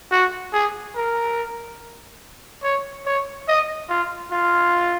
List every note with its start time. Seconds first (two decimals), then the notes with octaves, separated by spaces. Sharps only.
0.11 F#4
0.53 G#4
0.95 A#4
2.63 C#5
3.06 C#5
3.48 D#5
3.89 F4
4.31 F4